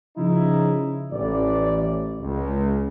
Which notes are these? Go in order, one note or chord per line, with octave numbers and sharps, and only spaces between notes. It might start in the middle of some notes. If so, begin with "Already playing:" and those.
C#3 F3 D#4 E4
A1 D5
C#2